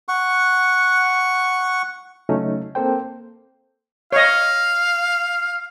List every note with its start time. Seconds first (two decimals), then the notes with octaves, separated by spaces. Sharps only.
0.08 F#5 C#6
2.29 C#3 F#3 A3 C#4 D#4
2.75 A#3 C4 A4 C5 G5
4.12 C#5 D#5 F5